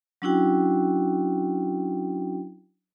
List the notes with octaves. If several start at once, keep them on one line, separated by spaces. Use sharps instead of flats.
F#3 C#4 D4 E4 F#4 G5